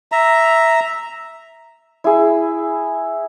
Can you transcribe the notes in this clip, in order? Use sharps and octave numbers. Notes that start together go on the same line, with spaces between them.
E5 A#5
E4 G#4